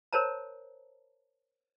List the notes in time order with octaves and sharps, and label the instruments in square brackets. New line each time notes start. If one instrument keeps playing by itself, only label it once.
[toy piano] A#4 C5 C#5 A5 A#5